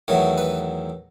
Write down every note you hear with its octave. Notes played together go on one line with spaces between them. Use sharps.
E2 D#3 F#3 A3 C#5
B4